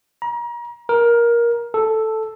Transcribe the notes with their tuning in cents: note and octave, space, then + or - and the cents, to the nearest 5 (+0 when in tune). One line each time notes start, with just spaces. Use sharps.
A#5 +35
A#4 +15
A4 +0